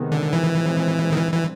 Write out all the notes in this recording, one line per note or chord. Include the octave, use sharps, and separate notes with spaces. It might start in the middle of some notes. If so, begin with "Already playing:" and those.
Already playing: C3 D#3 G#3 B3
D3
E3
A#2 F3 G#3 C4
D#3
D3 E3 G3 C4
E3